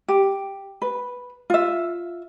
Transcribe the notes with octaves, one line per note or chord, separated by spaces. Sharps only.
G4
B4
F4 E5